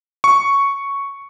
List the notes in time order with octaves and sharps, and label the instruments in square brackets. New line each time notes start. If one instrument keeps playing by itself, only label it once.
[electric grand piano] C#6